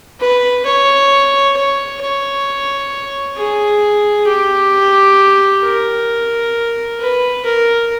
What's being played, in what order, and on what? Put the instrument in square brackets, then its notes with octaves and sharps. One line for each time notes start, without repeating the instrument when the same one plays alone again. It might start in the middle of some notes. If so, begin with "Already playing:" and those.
[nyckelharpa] B4
C#5
C#5
C#5
G#4
G4
A#4
B4
A#4